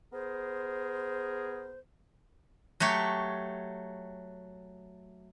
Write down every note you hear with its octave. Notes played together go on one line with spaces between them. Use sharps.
B3 G#4 A#4 C5
F#3 A3 G4 C#5